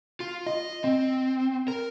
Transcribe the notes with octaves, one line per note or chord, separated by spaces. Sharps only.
F4
D#5
C4
A#4